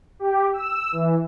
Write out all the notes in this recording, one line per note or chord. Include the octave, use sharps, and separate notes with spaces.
G4
E6
E3